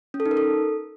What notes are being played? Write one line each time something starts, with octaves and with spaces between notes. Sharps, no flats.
C#4
A4
D#4
A#4
A4